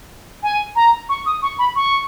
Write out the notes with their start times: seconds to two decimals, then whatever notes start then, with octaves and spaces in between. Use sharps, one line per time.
0.43 G#5
0.76 A#5
1.09 C#6
1.26 D#6
1.42 C#6
1.59 B5
1.76 C#6